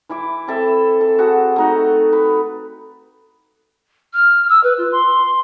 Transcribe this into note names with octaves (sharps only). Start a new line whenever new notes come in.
E3 E4 D6
C4 A4 E5
A4
F#4 G#4 A4
A3 D#4 F#4
B4
F6
E6
B4
F4
C6